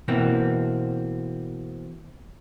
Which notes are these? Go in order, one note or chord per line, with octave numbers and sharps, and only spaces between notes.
B2 E3 A#3 C4